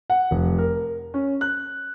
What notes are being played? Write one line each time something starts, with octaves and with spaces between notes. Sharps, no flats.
F#5
F1
A#4
C#4
F#6